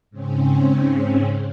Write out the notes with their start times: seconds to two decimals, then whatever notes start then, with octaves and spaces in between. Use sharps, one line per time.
0.11 G#2 C#3 C4 C#4